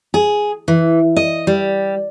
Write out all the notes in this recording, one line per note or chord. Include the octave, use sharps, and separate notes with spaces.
G#4
E3
D#5
G3